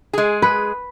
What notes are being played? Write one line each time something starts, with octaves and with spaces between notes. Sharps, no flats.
G#3 G#4
B4